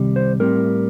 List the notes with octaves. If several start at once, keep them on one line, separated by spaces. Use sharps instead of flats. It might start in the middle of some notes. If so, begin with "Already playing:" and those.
Already playing: C2 C3 D#3 G3
C5
A2 G3 C4 A#4